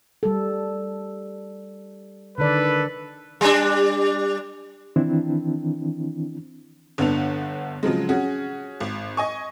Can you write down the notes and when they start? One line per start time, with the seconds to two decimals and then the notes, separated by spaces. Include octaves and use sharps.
0.23 G3 A4
2.38 D3 D#3 A4 B4 D5
3.41 G3 D4
4.96 D#3 E3 C4 D4 E4
6.98 G1 D3 B3 D4 F#5 F7
7.83 C#3 F3 F#3 G#3
8.09 C#4 F#4 G#4
8.80 G#1
9.17 D#5 G#5 C#6